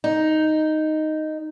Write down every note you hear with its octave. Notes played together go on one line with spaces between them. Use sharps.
D#4